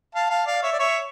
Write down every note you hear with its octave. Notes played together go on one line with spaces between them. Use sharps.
F5 A5
F5 A5
D5 F5
C#5 E5
D5
C#5 E5